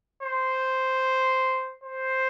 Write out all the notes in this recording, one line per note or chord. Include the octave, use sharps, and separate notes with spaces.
C5
C5